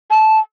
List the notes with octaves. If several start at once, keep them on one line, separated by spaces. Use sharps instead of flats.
A5